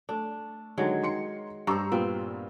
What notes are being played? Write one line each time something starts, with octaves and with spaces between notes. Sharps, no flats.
A3 D4
D3 D#3 F#3 G#3
D#3 C6 C#7
G2 C5 A#5 C#6 E6
A#2 B3 C4 F4